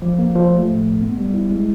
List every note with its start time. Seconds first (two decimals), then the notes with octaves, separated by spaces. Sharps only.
0.02 F3
0.19 A#3
0.35 F3
0.52 A3
0.68 A2
0.85 B1
1.01 B3
1.18 G3
1.34 E4
1.51 G#3